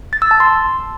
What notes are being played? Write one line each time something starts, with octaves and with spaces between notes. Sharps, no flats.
A6
E6
A5
C6